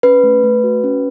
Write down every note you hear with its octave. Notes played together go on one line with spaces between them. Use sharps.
C#4 B4
A3
A3
F#4
C#4